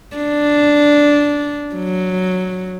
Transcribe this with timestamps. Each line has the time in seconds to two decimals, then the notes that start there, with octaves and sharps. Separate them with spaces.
0.17 D4
1.75 F#3